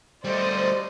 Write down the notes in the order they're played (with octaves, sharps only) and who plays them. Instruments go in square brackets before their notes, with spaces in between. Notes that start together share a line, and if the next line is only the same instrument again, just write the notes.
[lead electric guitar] G3 A3 [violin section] C5 D5 D#5